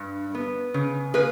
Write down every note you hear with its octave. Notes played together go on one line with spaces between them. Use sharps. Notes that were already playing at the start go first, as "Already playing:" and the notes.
Already playing: G2
B3
C#3
A#3 G#4 B4